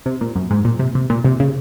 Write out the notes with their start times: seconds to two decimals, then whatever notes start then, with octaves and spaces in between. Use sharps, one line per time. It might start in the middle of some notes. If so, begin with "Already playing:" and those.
0.06 C3
0.21 A#2
0.36 F#2
0.51 G#2
0.65 A#2
0.79 C3
0.95 C3
1.10 A#2
1.25 C3
1.40 C#3